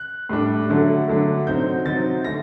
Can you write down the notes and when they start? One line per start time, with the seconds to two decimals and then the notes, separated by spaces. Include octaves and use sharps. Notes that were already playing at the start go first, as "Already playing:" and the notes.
Already playing: F#6
0.29 A2 G3 D4
0.69 D3 F#3 A3 D4
1.08 D3 F#3 A3 D4
1.47 C3 F#3 C4 D#4 G6
1.86 C3 F#3 C4 D#4 A6
2.24 D3 A3 A#6